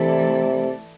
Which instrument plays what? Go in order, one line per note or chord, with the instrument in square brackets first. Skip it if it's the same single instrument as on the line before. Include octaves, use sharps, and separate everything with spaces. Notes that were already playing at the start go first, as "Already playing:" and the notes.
Already playing: [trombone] C3 [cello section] E3 A3 E4 A4 D5